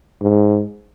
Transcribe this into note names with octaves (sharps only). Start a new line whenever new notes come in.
G#2